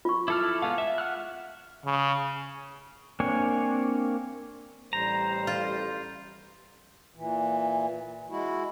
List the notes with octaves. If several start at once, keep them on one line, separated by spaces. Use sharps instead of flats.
F4 C#6
E4 A4 D6 F6
G#3 B3 F5
E5
F#5 F6 F#6
C#3
A#3 C4 D4 C#5 G#5
A1 G3 C5 A#5
F4
A#2 E3
G#3 E4 F#4